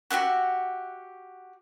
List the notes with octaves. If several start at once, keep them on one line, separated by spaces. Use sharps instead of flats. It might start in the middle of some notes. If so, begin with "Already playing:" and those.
F#4 G4 E5 F#5